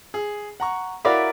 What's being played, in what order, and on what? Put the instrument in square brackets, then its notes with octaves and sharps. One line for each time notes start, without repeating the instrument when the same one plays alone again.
[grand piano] G#4
F#5 A#5 C#6
[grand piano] E4 F#4 F5 [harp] A#4 D5 B5